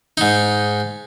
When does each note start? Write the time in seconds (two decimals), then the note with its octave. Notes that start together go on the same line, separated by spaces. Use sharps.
0.17 G#2 D#4